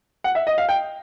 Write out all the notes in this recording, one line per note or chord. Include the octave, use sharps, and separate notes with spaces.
F#5
E5
D#5
F5
G5